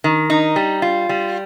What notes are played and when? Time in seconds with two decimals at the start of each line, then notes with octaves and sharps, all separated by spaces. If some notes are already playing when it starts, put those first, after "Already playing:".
0.04 D#3
0.30 D#4
0.56 G3
0.82 F4
1.09 G3